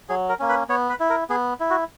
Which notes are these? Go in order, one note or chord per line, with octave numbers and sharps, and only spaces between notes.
F#3 G#4
A#4
A#3 C#4
B4
B3 C#5
B4
E4
A#4
B3 G#4
E4
F#4